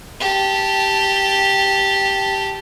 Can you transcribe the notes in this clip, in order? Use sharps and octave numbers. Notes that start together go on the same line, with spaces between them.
G4 A5